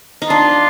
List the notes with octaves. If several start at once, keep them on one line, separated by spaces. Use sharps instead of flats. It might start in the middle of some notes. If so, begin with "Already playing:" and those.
D#4
D4 F4